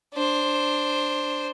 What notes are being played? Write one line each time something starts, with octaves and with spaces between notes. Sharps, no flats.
D4 C5